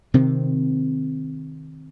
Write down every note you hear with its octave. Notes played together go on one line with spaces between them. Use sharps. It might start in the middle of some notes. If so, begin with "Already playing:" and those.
C3 D#3 C4